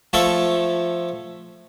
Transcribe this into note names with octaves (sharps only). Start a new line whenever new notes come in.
F3 A3 A4 C#5 E5